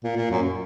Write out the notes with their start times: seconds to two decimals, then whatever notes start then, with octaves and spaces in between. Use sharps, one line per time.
0.04 A#2
0.17 A#2
0.31 F#2